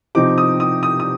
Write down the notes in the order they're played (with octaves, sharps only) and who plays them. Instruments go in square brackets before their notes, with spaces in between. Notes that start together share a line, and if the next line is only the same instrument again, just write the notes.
[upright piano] C3 F3 C4 D#4 D6
D#6
D#6
D#6
D#6